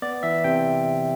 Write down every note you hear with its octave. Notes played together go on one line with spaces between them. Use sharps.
B3 D5
E3 E5
C3 G5